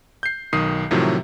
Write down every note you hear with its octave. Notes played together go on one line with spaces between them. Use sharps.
G6 C7
B1 D#3 D#6 C7
A2 C3 D#3 F3 F#3